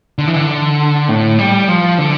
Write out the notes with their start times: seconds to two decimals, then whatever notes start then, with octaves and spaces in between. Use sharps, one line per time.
0.18 D3
0.28 E3
0.36 D3
1.09 A2
1.39 G3
1.68 F3
1.98 D3